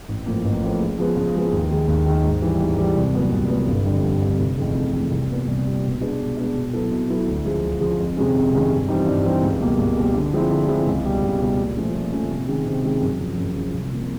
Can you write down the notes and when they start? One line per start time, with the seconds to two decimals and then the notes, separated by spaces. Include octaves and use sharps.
0.08 A1
0.26 A2 F3 A#3
0.45 A1
0.62 A2 F3 A#3
0.80 C#3
0.99 F3 G#3 B3
1.17 C#3
1.35 F3 G#3 B3
1.53 D#2
1.71 D#3 G#3
1.88 D#2
2.06 D#3 G#3
2.24 G#2
2.42 E3 G3
2.60 G#2
2.78 E3 G3
2.96 C2
3.14 A#2 F#3 B3
3.32 C2
3.50 A#2 F#3 B3
3.68 G1
3.85 F2 D3 G3
4.04 G1
4.22 F2 D3 G3
4.39 F1
4.58 F2 C#3 E3 A3
4.76 F1
4.94 F2 C#3 E3 A3
5.11 C2
5.29 A#2 G3 B3
5.47 C2
5.65 A#2 G3 B3
5.84 B2
6.01 G#3 B3 D4
6.19 B2
6.37 G#3 B3 D4
6.55 B2
6.73 F#3 B3 E4 A4
6.91 B2
7.09 F#3 B3 E4 A4
7.27 D2
7.45 C#3 F3 G#3
7.63 D2
7.81 C#3 F3 G#3
7.99 F2
8.17 C3 D#3 G#3 C#4
8.35 F2
8.53 C3 D#3 G#3 C#4
8.71 G2
8.89 E3 G3 C4 D#4
9.07 G2
9.24 E3 G3 C4 D#4
9.42 C#2
9.61 B2 G3 A#3
9.78 C#2
9.97 B2 G3 A#3
10.14 D3
10.33 F3 G#3 C4 E4
10.50 D3
10.68 F3 G#3 C4 E4
10.87 C#2
11.05 B2 G3
11.22 C#2
11.40 B2 G3
11.58 A#2
11.76 F3 A3 C#4
11.94 A#2
12.13 F3 A3 C#4
12.30 C3
12.48 D#3 G#3 C#4
12.66 C3
12.84 D#3 G#3 C#4
13.01 F#2
13.20 C#3 F3
13.38 F#2
13.55 C#3 F3
13.74 C2
13.91 C3 F3 A#3